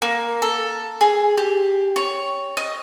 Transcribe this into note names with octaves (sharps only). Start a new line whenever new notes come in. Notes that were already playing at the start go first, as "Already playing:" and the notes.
A#3
A4
G#4
G4
C#5
D#5